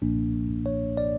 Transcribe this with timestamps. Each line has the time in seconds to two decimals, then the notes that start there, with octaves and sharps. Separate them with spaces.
0.02 B1 A#2 F3 A#3 D4
0.66 C#5
0.97 D5